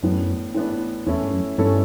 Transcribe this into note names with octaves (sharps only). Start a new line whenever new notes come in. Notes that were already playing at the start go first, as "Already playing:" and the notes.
F#2 A2 E3 B3 D4
A2 E3 B3 D4
E2 E3 A3 C#4 E4 A4
G2
F#2
G2 E3 A3 C#4 E4 A4